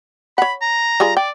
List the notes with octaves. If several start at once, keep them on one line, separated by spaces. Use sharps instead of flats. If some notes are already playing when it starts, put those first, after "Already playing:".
C#5 F#5 B5
A#5
G3 F4 G#4
D5 G5